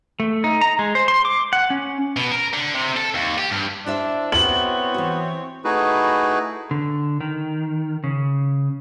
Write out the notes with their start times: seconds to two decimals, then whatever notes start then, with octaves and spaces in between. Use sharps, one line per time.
0.20 A3
0.44 D#4
0.61 A#5
0.79 G#3
0.95 C5
1.08 C6
1.25 D6
1.53 F#5
1.70 C#4
2.17 B2
2.32 A#4
2.54 D3
2.74 C3
2.97 A4
3.15 D#2
3.38 G4
3.51 G2
3.86 D4 E4 C5 E5
4.32 B3 C4 E4 F#4 C#5 F#7
4.94 E3 F#4
5.64 A3 D#4 E4 F#4 G#4 B4
6.71 D3
7.21 D#3
8.04 C#3